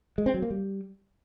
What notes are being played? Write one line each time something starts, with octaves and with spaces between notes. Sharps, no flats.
G#3
C4
F#3
A#3
G3